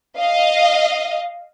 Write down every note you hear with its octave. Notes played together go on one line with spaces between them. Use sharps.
D#5 F5